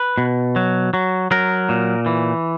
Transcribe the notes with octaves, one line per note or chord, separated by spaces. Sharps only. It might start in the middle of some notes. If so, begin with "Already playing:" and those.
Already playing: B4
B2
F#3
F#3
F#3 A#4
A#2
E3